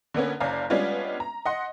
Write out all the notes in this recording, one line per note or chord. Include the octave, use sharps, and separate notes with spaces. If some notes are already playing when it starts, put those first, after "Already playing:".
D3 A#3 B3 C#4
F#1 C#4 D5 F5 A#5
G3 G#3 B3 C#4 D4 F4
A#5
D#5 F#5 C6